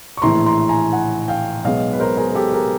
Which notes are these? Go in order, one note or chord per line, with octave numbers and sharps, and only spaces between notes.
C#6
A#1 A2 E3 A#5 C6
A#5 C6
G#5 A#5
F#5 G#5
F5 G5
B1 B2 G#3 D#5 F5
B4
A#4 C5
G#4 A#4
A#4
G4 A4
G#4 A#4